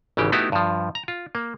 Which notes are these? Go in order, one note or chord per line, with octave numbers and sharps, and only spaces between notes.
G#1 C#3 E3 G4
A3 B3 D#4 E4 F#4 G4
G2 F3
A#5
F4
A#3